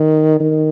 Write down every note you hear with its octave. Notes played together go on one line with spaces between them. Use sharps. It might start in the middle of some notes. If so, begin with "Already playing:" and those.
Already playing: D#3
D#3